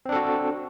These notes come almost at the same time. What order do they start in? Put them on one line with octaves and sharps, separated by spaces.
C4 D4 A4 F#4